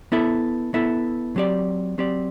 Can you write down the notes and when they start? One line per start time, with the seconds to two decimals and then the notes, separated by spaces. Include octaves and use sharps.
0.12 B3 E4 A4 E5
0.74 B3 E4 A4 E5
1.36 F#3 C4 G4 D5
1.98 F#3 C4 G4 D5